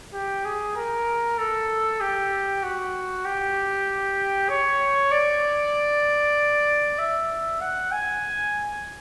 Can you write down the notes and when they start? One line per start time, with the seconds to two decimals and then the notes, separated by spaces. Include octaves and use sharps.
0.14 G4
0.45 G#4
0.76 A#4
1.38 A4
2.00 G4
2.63 F#4
3.25 G4
4.49 C#5
5.12 D5
6.99 E5
7.61 F#5
7.92 G#5